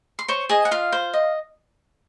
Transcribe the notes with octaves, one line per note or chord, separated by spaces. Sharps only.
C6
C5 C#5 C#6
G#4 D#5 G#5
F#5
F4 F5
C5
D#5